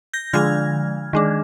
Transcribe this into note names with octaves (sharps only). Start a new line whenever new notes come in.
G6 A#6
D3 F3 G#3 F6 G#6
D#3 G#3 D4